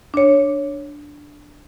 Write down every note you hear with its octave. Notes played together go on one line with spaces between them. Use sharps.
D4 C#5